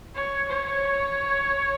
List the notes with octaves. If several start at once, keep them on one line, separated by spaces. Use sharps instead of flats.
C#5
C#5